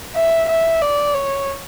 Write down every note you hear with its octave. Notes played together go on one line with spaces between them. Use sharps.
E5
E5
D5
C#5